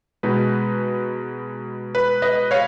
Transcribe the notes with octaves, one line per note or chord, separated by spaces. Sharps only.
B2 G#3 D#4 B4
B4
B4 D#5
C#5 F5